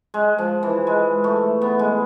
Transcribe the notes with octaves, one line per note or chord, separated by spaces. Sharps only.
G#3
F3
E3
G#3
A3
B3
G#3